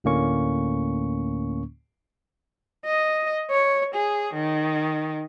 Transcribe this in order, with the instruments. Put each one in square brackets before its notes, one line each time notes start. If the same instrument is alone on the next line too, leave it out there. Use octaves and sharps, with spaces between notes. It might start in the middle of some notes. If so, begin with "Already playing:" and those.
[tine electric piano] D2 A2 D3 A#3 C#4 C#6
[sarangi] D#5
C#5
G#4
D#3